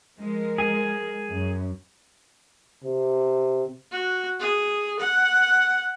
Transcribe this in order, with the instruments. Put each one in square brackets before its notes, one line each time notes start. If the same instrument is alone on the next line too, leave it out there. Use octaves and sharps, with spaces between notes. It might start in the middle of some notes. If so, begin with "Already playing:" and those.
[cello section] F3 G#3 A#4
[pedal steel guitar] G#4
[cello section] F#2
[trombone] C3
[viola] F#4
G#4
F#5